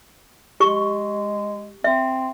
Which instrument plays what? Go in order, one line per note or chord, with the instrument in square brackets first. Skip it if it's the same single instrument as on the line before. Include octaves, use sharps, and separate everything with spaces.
[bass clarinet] G#3 [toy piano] G4 C#6
[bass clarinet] C4 [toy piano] E5